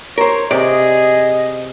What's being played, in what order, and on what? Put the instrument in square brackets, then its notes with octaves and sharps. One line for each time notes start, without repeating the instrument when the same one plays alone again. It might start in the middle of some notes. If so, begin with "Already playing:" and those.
[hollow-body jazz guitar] A#4 C5 [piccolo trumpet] C#5
[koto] C3 [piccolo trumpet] G#4 [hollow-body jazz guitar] D5 [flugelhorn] D#5